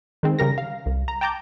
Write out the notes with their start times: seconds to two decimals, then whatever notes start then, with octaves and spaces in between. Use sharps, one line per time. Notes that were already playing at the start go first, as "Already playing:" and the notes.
0.23 D#3 G#3 C4
0.39 C#3 G3 A#4 A#6
0.58 F5
0.86 C2
1.08 A#5
1.21 G5 A5 A#5 D6 G6